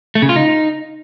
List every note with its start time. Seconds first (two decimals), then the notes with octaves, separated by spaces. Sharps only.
0.15 A3
0.22 C#3
0.29 F4
0.36 D#4